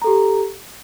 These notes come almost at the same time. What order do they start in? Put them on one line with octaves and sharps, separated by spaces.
A#5 A4 G4